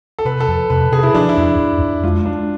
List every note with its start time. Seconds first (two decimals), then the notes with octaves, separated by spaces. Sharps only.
0.19 A4
0.25 C3 B4
0.40 A4
0.48 F2
0.70 C3 B4
0.92 C3 G#4
1.03 E4
1.14 F3 D4
1.29 E4
1.37 F2
1.59 F2
1.82 F2
2.04 G#3 F4
2.26 G#3 D4